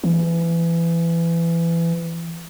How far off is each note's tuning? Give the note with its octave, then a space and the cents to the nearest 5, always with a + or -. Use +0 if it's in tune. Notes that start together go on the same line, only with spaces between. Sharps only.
E3 +25